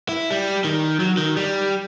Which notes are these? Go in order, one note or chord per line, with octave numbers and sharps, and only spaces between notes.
E4
G3
D#3
F#3
D#3
G3